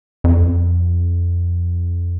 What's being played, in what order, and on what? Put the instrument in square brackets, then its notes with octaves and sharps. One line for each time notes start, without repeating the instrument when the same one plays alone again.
[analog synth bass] F2